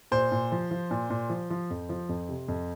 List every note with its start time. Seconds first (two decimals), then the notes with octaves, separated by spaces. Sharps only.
0.12 A#2 C5
0.32 A#2
0.52 F3
0.71 F3
0.91 A#2
1.10 A#2
1.30 F3
1.50 F3
1.70 F2
1.89 F3
2.09 F2
2.29 C3
2.48 F2